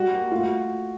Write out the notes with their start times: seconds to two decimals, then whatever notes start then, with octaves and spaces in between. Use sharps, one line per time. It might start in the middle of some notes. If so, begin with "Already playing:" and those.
Already playing: G3 F#4
0.12 A#3
0.31 A3 F4
0.40 F#4